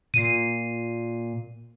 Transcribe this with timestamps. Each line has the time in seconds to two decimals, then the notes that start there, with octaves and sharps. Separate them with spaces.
0.14 A#2 C7 D#7